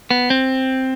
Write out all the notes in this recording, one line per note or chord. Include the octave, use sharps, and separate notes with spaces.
B3
C4